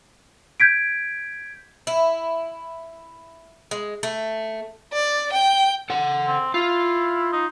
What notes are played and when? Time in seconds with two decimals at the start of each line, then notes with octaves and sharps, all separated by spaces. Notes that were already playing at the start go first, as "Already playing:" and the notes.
0.60 G6 G#6 B6 D7
1.87 E4
3.71 G#3
4.03 A3
4.93 D5
5.33 G5
5.90 A4 F#5
6.28 C4
6.54 E4 F4
7.33 D#4